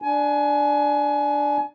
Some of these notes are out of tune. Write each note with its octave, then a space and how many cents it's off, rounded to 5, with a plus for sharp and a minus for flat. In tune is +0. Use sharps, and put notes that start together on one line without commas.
D4 +5 G#5 +25